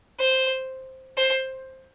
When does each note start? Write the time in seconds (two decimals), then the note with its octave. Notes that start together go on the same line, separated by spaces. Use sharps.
0.19 C5
1.17 C5